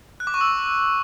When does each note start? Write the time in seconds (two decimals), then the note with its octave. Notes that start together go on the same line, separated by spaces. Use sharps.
0.20 F#6
0.27 D6
0.34 C#6
0.41 E6